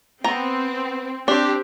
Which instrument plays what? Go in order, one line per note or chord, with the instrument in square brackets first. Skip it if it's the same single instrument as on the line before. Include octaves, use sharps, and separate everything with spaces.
[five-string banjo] B3 A#5 [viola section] C4
[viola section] C4 G4 [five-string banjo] D4